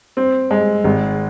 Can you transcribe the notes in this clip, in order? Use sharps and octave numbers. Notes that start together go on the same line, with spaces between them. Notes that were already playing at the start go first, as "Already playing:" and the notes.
C4
G#3
G#1